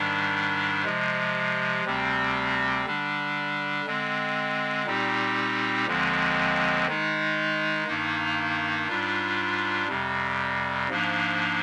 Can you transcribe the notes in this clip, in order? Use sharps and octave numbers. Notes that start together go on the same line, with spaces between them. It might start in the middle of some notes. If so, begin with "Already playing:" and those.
Already playing: G#2 D#3 G3 D4
C3 F3 G#3
D2 C3 G3 C4
D3 G3 D4
D3 G#3 C4
A#2 G3 C4 D#4 G4
D#2 D3 F3 G#3 C4
D#3 G#3 D#4
G2 D#3 A#3 D#4
G#2 G3 D4 F4
F2 C3 G3
G#2 F3 A#3 D4